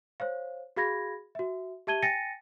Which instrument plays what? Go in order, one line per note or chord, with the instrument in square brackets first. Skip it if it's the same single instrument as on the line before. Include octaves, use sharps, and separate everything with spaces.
[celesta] C5 C#5 F5
F#4 G#4 F5 B5 G#6 A#6
F#4 E5
G4 E5 A5 G#6 D#7 G7
G5 G#5 A6 A#6 C#7 D#7